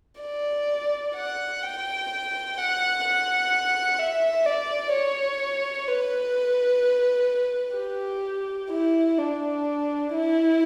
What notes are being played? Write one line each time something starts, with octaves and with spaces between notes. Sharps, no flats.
D5
F#5
G5
F#5
F#5
E5
D5
C#5
B4
G4
E4
D4
E4